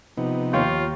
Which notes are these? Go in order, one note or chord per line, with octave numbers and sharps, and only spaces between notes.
C3 F3 B3 D#4
D#2 F4 C#5 G6